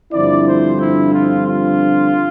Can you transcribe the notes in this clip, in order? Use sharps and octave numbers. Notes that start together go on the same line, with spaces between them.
G2 D3 F3 C4 E4 D5
C5
E4
F4
F4